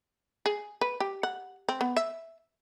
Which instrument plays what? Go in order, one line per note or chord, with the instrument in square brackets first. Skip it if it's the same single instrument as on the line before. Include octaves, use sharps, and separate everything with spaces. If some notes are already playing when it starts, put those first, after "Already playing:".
[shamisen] G#4
B4
G4
F#5
C4
B3
E5